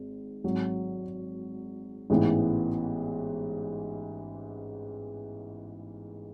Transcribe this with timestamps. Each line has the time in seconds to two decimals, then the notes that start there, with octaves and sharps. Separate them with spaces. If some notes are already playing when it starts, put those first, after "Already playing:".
Already playing: G#1 G#2
0.44 G#1 G#2 F#3
2.10 A1 G#2 E3 B3 E4